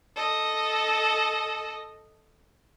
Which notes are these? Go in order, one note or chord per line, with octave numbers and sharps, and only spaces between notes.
A4 D#5